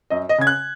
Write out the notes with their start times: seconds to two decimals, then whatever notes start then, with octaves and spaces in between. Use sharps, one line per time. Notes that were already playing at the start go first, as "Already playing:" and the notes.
0.10 F#2 D#5
0.29 D#5
0.38 C#3 G#6
0.47 F#6